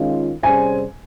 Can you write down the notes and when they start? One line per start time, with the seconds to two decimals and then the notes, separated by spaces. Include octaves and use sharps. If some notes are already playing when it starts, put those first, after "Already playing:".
Already playing: D#3 G#3 C#4 F4
0.43 C3 G3 C#4 G#4 C5 G#5